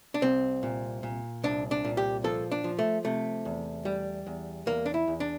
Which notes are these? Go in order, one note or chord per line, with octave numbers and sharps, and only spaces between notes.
D4
C2 C4
A#2
A#2
C2 D4
D4
A#2
G4
F3 A4
D4
F3
A3
C3 A3
E2
G3
E2
E2 A#3
D4
E4
E2
D4